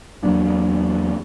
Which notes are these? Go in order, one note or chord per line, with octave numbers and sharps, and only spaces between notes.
E2 F#3 A#3 D4